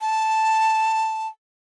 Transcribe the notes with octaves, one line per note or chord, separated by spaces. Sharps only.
A5